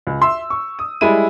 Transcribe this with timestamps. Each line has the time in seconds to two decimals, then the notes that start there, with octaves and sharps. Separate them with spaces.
0.07 C#2
0.21 E5 C6 E6
0.50 C#6
0.79 D#6
1.01 G3 G#3 E4 D#7